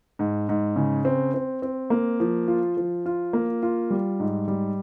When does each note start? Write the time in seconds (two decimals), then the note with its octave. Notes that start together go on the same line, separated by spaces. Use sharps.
0.19 G#2
0.49 G#2
0.76 C#3
1.05 C4
1.34 C4
1.62 C4
1.90 A#3
2.20 F3
2.48 F4
2.77 F3
3.06 F4
3.33 A#3
3.63 F4
3.90 G3
4.20 G#2
4.48 G3